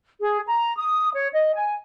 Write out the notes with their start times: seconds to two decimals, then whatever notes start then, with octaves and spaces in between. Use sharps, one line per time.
0.19 G#4
0.45 A#5
0.77 D#6
1.12 C#5
1.33 D#5
1.54 G#5